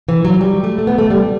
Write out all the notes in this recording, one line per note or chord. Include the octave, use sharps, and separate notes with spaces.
E3
F#3
G3
A3
A3
B3
A3
G3